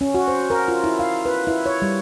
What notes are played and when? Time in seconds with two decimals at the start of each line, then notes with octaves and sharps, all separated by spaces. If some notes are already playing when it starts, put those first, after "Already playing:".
0.01 C#4
0.15 F#4
0.28 C5
0.50 A#4
0.68 F4
0.84 E4
0.99 F5
1.26 B4
1.47 E4
1.66 C#5
1.82 G3